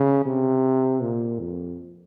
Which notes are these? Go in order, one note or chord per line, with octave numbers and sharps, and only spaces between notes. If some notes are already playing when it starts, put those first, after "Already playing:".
Already playing: C#3
C3
A#2
F2